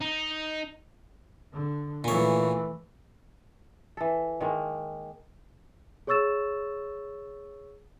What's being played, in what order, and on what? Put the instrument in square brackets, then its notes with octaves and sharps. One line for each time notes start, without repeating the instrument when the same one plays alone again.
[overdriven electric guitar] D#4
[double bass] D3
[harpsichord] A#2 C#5 [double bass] E3 A3
[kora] E3 A4
D#3 G#3 A#3
[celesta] G#4 C#5 C#6 E6 A6 E7